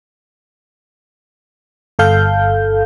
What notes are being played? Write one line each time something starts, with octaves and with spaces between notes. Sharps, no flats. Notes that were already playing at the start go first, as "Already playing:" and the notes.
G1 A4 F5 G6